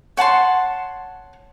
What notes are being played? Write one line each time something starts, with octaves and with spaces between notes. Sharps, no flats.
C#5 F#5 A5 C6